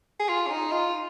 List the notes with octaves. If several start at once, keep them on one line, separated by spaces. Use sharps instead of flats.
G#4
F4
C#4
D#4
F4